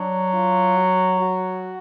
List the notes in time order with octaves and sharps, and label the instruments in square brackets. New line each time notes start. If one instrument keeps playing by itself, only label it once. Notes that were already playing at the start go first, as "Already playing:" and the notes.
Already playing: [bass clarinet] F#3 [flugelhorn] D4
[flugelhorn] F4
F#4
F#4